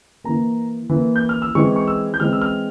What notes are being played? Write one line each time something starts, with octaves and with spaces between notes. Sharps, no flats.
E3 A#3 A#5
E3 A#3
G6
F6
E6
E3 G#3 C4 C#6
C#6
E6
G6
E3 G#3 C4 F6
E6
F6